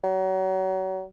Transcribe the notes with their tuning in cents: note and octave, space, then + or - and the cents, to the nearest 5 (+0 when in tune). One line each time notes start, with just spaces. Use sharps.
F#3 +30